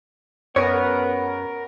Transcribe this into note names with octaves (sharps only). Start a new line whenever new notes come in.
F#2 B3 G#4 A#4 C#5